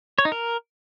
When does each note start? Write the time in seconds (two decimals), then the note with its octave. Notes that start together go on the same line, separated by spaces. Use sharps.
0.19 C#5
0.25 D#4
0.32 A#4